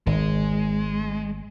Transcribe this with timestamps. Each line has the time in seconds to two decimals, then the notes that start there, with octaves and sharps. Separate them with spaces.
0.07 G#1 G#3